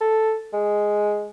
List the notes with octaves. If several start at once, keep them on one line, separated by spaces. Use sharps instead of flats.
A4
G#3